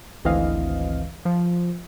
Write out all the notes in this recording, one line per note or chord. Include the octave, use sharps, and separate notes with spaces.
G#1 D2 E3 C4 D#5 F5
F3